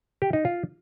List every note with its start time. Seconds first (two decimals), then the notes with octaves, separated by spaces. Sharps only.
0.22 G4
0.33 D#4
0.45 F4